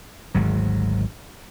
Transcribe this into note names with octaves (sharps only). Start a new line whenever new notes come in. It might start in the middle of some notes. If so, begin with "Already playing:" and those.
G#1 D2 G#2 F#3